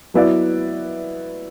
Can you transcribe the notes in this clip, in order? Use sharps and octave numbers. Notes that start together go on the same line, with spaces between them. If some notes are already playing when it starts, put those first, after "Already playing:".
F#3 B3 E4 B4 D5